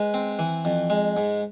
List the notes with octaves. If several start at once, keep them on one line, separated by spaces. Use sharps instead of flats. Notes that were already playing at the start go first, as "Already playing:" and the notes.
Already playing: G#3 B4
C4
E3
F2
G#3
G#2